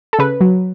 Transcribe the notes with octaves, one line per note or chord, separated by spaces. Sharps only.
A4
C#3 B4
F#3